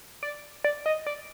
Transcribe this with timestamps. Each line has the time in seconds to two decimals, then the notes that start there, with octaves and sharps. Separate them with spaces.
0.23 D5
0.64 D5
0.86 D#5
1.06 D5